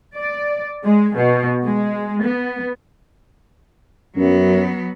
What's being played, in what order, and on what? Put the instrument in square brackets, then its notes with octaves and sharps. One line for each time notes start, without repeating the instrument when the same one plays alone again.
[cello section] D5
G#3
B2
G#3
B3
[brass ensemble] F#2 [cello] F#3 B3